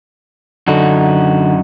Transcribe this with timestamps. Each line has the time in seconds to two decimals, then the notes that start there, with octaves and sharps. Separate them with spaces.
0.67 F#2 D3 D4 D#4 F#4 A#5